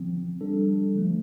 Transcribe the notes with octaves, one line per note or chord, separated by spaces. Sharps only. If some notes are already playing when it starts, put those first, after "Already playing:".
Already playing: D3 F3 C4
G3 D4 A4
D3 F3 A3